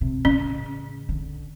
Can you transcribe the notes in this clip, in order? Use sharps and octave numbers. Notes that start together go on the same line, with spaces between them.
C3
A1 C#3 C#4
D3